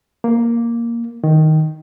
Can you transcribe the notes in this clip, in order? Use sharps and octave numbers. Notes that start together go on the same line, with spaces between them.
A#3
D#3